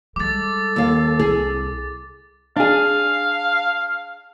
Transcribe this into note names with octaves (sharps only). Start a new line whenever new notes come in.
G3 G#3 A4 D6 A6
D#2 F5
C2 G#4
D4 G#4 F5